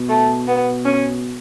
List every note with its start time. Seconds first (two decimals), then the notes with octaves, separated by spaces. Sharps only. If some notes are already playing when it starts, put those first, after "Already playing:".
Already playing: B2
0.09 A3
0.47 B3
0.85 C#4